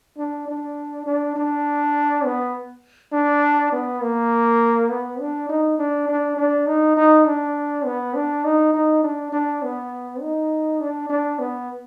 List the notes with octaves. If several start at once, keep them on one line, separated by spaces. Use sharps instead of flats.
D4
D4
D4
D4
B3
D4
B3
A#3
B3
D4
D#4
D4
D4
D4
D#4
D#4
D4
B3
D4
D#4
D#4
D4
D4
B3
D#4
D4
D4
B3